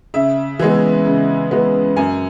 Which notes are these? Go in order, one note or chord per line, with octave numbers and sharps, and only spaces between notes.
C#3 E5
E3 G#3 B3
C#3
E3 G#3 B3
F#2 G#5